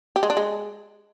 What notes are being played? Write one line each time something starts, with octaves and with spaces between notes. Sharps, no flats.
G4
G#3
D4
G#3